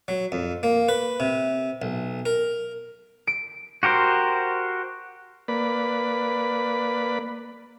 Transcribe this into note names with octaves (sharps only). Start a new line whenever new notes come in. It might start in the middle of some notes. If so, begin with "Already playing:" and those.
F#3
F2
A#3
B4
C3
B1
A#4
D7
F#4 G4 A#4 C5
A#3 B4 D5 B5